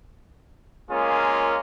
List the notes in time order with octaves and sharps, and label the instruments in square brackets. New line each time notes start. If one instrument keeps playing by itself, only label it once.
[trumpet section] G#3 A#3 C#4 F4 G#4 A#4